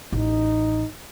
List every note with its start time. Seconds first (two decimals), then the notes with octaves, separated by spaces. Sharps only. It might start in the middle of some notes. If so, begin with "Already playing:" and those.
0.12 A1 D#4